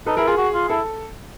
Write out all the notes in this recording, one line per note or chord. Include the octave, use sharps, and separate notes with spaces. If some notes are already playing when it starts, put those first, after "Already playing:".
D#4 A4 B4
E4 G#4 A#4
F4 G#4
F#4
F4
E4 A4